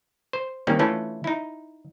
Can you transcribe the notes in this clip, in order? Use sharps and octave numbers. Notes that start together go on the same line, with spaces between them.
C5
D#3 G3 A#3 C4 C#4
E3 A3 C#4 D4 E4 F4
D#4 E4